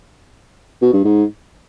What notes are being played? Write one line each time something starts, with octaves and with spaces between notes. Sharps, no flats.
B2
G2
G#2